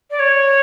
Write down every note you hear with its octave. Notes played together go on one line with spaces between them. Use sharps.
D5
C#5